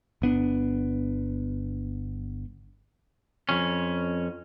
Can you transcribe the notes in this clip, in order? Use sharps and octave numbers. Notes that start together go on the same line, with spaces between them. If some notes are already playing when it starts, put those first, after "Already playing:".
G1 B3 D4
F2 C#4